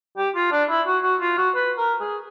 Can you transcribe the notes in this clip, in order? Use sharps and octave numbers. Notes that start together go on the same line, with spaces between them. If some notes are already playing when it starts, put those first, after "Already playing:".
G4
F4
D4
E4
F#4
F#4
F4
F#4
B4
A#4
G#4